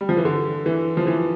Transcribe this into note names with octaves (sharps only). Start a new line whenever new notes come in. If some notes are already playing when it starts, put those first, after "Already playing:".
G3
F3
E3
D3
E3
F3
E3